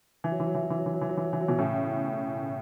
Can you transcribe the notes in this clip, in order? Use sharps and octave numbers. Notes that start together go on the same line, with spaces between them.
E3
F#3
E3
F#3
E3
F#3
E3
F#3
E3
F#3
E3
F#3
E3
F#3
E3
F#3
B2 E3
A2 C#3